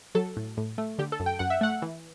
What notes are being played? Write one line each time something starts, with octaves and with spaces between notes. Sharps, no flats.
F#3 A4
A2
A2
A3
D3 G4
A4
F#2
G5
F#2 F#5
E5
A3 F#5
E3